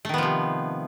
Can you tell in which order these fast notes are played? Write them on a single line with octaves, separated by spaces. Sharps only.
A3 D#3 B3 F3 C3